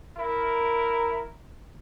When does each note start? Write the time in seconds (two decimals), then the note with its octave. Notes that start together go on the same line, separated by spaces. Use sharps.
0.17 E4 A#4